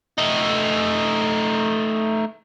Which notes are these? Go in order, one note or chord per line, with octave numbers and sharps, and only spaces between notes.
A3 D#4